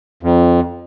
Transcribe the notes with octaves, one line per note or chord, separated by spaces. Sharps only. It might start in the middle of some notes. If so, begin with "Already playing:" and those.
F2